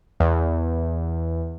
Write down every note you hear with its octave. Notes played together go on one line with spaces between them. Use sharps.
E2